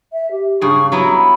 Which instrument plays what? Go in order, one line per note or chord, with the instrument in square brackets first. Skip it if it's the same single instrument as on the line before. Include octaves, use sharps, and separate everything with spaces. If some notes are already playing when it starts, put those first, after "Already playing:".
[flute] E5
G4
[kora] G2 C#3 G#4 [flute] C#6
[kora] F#3 B3 E4 [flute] A#5
[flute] B5